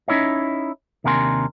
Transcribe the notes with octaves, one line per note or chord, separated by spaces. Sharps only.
C#4 D#4 E4 C#5 D#5
D#2 C3 D4 A#4 G#5 C6